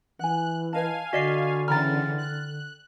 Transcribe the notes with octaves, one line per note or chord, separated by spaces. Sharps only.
E3 F#5 G#5 F#6
B4 D#5 F5 G#5 A5
D3 F#4 D5 D#5 C7
C#3 E3 G5 A#5 B5 F6 A6
F#6